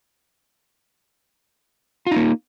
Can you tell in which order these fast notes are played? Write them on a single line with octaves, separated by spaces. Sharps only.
F4 D#4 A#3